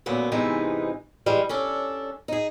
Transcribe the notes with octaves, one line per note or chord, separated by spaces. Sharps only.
F#2 A#2 D3 B3
G#2 C3 E3 G#3 B3 D#4
E3 G3 G#3
C#4 D4 A4
D#4 G#4